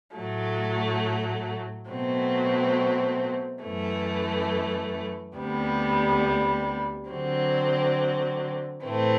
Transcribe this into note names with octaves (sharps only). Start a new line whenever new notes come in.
A2 F#3 A3
B2 F#3 A3 C4
F#2 E3 A3
D2 C3 G3 B3
D3 F#3 C4
A2 E3 A3 C4